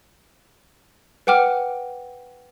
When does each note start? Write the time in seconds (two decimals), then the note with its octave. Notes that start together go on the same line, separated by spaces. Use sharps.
1.27 B4 F#5 G5 D6 F6